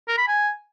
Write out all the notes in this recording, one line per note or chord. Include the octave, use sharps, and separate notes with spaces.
A#4
B5
G#5